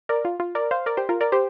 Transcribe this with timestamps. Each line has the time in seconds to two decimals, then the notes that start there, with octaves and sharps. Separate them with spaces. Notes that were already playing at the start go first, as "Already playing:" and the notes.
0.09 A#4 D5
0.25 F4
0.40 F4
0.55 A#4 D5
0.71 C5 F5
0.86 A#4 D5
0.97 G4 C5
1.09 F4 A#4
1.21 A#4 D5
1.32 G4 C5